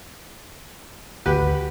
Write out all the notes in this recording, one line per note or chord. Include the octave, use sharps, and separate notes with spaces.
G#1 D2 F#4 G4 B4